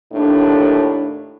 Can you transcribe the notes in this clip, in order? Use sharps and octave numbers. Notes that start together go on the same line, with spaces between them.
D#2 A2 D4